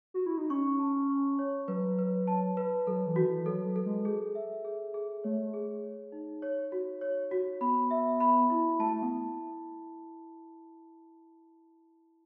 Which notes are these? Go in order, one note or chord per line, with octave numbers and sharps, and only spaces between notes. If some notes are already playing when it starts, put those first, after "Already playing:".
F#4
E4
D#4
C#4 C#6
A5
C#6
C#5
F#3 B4
B4
A5
B4
F#3 A4
E3
D#3 F#4
E3
F#3 A4
F#3
A4
G#3
G#4
E5
G#4
G#4
A3 C#5
G#4
C#5
D#4
C#5
F#4
C#5
F#4
B3 B5
E5
B5
E4
A3 A5
B3